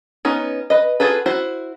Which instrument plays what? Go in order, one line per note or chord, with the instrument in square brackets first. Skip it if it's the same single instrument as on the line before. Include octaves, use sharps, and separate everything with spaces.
[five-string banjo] B3 C#4 D#4
B4 D#5
F4 F#4 G#4 A4 B4
E4 F#4 C5